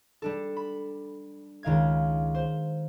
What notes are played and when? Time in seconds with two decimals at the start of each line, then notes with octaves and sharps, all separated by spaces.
0.22 G3 D4 A4
0.57 B5
1.63 C#2 D#3 F5 G#6
2.35 C5